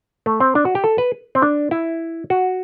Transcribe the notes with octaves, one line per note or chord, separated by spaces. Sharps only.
A3
C4
D4
F#4
G4
A4
B4
C4
D4
E4
F#4